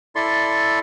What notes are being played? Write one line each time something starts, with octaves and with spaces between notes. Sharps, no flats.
E4 A4 D5 C6